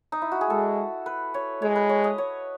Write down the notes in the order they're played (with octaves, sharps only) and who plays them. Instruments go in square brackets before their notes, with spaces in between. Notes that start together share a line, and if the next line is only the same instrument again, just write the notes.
[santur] D#4
E4
F#4
G#4
[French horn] G#3 [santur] A4
[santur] B4
C#5
[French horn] G#3 [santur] C#5
[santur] B4
C#5
D#5
C#5